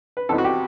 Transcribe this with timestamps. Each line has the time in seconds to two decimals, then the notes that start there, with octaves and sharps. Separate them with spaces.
0.17 B4
0.29 C2 C3 E3 B3 D#4 A4
0.38 F#4
0.44 G4